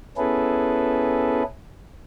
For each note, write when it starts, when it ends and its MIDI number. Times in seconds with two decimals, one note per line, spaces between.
0.17 1.43 59
0.17 1.43 61
0.17 1.43 64
0.17 1.43 68
0.17 1.43 69
0.17 1.43 71